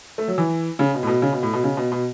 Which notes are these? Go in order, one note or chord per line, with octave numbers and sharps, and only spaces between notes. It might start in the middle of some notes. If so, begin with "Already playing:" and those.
A3
F#3
E3
C#3
B2
A2
B2
C#3
B2
A2
B2
C#3
B2
B2